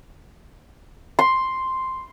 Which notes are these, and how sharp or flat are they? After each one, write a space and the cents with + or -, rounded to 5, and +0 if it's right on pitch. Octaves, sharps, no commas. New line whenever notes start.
C6 +0